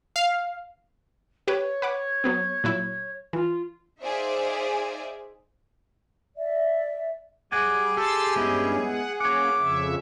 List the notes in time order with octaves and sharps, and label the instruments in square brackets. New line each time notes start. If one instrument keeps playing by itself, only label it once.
[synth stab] F5
[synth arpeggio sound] G4 B4 [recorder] C#5
[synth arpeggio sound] B4 F#5 D6
F#3 B3 C4
A#2 F#3 E4
[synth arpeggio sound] E3 [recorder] F4
[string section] D#4 G#4 C5 D5 E5 F5
[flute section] D5 E5
[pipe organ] G3 [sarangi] G#4 [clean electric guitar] F#5 G#5 [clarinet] D6
[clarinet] G4 [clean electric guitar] A4 [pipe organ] C6 E6 A6
[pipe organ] G2 G3 C#4 [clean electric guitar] G#3 B3 E4
[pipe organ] F#5
[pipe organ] A#3 C#4 [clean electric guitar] C#5 F#5 [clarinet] D6
[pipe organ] F2 C#3 E5